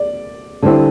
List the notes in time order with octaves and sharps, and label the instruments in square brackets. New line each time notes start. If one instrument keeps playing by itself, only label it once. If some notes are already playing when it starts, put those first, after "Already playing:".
Already playing: [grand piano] D5
[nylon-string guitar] D3 G3 C4 E4